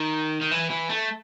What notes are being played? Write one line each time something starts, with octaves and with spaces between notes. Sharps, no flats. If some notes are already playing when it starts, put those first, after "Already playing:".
Already playing: D#3
D#3
E3
E3
A3